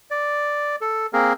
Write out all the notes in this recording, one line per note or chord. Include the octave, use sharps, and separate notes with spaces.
D5
A4
A#3 C4 G#4 A#4